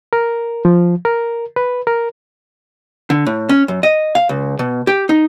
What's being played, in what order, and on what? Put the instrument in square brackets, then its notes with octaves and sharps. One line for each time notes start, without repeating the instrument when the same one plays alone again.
[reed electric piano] A#4
F3
A#4
B4
A#4
[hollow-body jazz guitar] D3
A2
C#4
F#2
D#5
F5
C#2
B2
G4
D#4